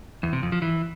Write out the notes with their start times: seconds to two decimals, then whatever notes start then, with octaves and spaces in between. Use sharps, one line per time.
0.23 E2
0.33 C3
0.42 F2
0.52 F3
0.62 E3